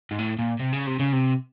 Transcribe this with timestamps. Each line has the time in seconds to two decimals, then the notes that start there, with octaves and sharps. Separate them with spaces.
0.11 G#2
0.19 A2
0.39 A#2
0.59 C3
0.73 C#3
0.87 C3
0.99 C#3
1.13 C3